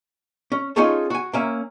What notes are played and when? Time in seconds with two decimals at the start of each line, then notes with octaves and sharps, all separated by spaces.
0.52 C#4
0.76 C#4 D#4 F4 G#4 A4 C#5
1.10 F#4 G#5
1.33 A#3 C#4 E5